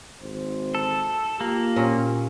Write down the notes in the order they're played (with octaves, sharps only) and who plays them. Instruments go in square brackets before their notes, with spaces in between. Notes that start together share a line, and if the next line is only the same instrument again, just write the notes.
[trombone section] G#1 C5
[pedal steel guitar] A4
[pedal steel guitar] A#3 [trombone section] F4 G4
[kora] A#2 C#4 A#4